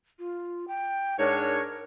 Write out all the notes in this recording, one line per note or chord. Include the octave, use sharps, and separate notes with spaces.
F4
G5
G#2 D4 A#4 C#5